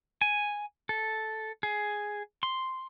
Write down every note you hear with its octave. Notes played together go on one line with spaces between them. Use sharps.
G#5
A4
G#4
C6